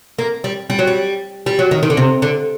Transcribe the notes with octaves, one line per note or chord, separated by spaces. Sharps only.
A#3
G3
G3
F#3
G3
G3
F#3
D#3
D#3
D3
C3
D3